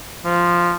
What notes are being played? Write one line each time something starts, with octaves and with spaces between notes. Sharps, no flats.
F3